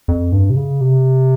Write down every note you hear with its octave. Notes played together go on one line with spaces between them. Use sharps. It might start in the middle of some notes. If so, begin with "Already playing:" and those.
F2
G2
C3
C#3
C3